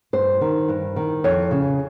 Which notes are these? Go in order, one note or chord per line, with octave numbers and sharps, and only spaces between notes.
G2 C5
D#3
G2
D#3
F2 C#5
C#3